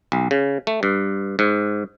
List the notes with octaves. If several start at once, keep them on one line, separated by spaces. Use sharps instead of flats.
B1
C#3
A3
G2
G#2